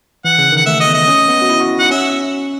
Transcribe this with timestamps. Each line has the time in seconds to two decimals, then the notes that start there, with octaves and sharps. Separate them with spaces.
0.25 E3 F#5
0.38 C#3
0.52 D#3
0.57 F#5
0.66 A3 E5
0.80 D#5
0.87 B3
0.94 D#5
1.08 C#4
1.28 B3
1.41 F#4
1.50 E4
1.60 F#4
1.80 D#4 F#5
1.91 C#4 E5